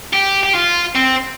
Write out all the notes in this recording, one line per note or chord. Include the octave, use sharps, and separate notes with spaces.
G4
G4
F4
C4